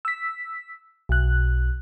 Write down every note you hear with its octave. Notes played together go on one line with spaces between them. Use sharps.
E6 B6
B1 F#6